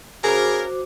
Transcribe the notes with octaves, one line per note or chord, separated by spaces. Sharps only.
C#3 F#4 G#4 A#4 C5 D6